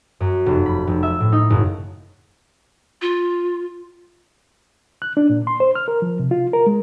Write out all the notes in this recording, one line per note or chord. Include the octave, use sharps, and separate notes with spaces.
F#2
F1
B5
F1
E5
A2
D#4
F#1
F4
F#6
D4
A#2
C6
C5
F6
A#4
F3
C3
F4
A#4
G#3